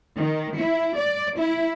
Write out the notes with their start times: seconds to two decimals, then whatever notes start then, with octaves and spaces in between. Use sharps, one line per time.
0.17 D#3
0.57 E4
0.97 D5
1.37 E4